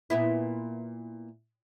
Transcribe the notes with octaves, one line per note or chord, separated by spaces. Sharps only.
A#2 B3 E4